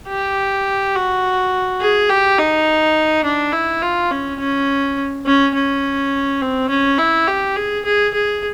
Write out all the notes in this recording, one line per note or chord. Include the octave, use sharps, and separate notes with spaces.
G4
F#4
G#4
G4
D#4
D4
E4
F4
C#4
C#4
C#4
C#4
C4
C#4
E4
G4
G#4
G#4
G#4